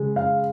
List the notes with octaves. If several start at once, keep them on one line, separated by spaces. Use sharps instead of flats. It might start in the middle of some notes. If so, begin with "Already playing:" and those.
Already playing: C#3 G#3
F5